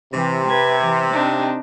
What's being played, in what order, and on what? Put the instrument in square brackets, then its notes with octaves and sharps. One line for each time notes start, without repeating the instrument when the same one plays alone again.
[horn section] C3 [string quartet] E3
[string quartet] B4 G#6
E3
C4 D4 D#4